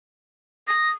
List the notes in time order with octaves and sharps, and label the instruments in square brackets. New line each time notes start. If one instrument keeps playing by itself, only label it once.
[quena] D#6 [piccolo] A#6